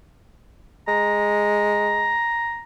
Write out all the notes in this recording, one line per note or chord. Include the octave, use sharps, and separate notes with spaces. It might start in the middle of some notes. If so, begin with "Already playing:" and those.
G#3 A#5